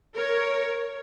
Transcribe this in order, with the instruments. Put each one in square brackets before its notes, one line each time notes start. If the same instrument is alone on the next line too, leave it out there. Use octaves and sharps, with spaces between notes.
[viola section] A#4 C#5